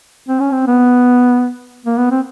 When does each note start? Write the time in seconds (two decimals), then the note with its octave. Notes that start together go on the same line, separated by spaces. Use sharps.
0.29 C4
0.40 C#4
0.52 C4
0.67 B3
1.85 A#3
1.98 B3
2.11 C4